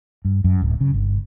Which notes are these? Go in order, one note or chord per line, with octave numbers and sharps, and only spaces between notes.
G2
F#2
D1
C#3
G1